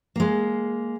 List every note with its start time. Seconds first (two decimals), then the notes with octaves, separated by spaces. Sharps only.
0.16 G#3 A#3